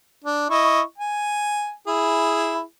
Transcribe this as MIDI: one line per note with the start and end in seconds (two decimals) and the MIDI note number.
0.24 0.49 62
0.50 0.81 64
0.50 0.81 75
0.50 0.81 85
0.98 1.72 80
1.87 2.61 64
1.87 2.61 68